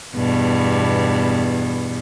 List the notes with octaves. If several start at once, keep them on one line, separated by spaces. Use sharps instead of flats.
E2 G2 B2